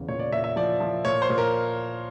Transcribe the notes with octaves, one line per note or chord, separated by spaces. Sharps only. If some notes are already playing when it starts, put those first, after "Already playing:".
Already playing: E2 C#3
A#2 C#5
D5
A#2 E5
E5
F3 D5
F3
A#2 C#5
C5
A#2
A#4